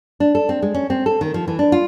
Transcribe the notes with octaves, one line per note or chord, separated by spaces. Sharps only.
D4
A4
C4
G#3
C#4
C4
A4
D#3
F3
E3
D4
F4